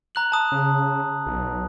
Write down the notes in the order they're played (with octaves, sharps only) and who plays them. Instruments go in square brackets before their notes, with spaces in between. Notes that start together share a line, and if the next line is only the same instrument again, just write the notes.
[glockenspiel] A#5 F#6 F#7
A5 D#6
[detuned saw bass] C#3
B1